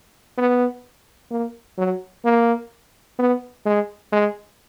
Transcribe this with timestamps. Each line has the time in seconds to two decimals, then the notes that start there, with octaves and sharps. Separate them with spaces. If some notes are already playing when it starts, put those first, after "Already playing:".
0.38 B3
1.31 A#3
1.78 F#3
2.25 A#3
3.19 B3
3.66 G#3
4.12 G#3